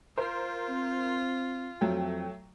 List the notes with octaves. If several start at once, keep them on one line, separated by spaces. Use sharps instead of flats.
F4 A#4 C5
C4
F2 F#3 A3 G5